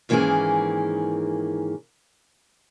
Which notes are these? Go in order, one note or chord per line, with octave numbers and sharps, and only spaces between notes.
G#2 D#3 E3 A#3 C#4 G#4